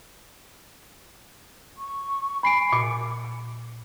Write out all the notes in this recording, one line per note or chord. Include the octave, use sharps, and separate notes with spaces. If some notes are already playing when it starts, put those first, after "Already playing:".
C#6
G#5 B5 C7 D7
A#2